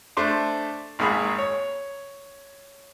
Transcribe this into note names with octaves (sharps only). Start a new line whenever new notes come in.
A3 D4 C5 D5
G#1 D#2 G#2 A#3 G#4 B5
C#5